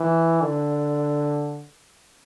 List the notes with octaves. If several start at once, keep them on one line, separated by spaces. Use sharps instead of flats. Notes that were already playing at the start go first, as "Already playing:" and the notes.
Already playing: E3
D3